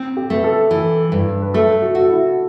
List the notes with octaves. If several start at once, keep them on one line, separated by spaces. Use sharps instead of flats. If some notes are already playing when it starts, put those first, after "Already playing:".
Already playing: C4
G4
A3 B4
A4
E3 A4
G2 B4
B4
A3 A4
F#4
F#4
E4